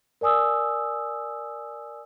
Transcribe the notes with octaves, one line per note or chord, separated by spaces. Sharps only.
A#4 D5 G#5 D#6 E6